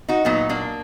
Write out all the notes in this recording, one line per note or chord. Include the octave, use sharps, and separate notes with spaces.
D#4 F#4
A#2 F#3 B3 D#4
A#3 D4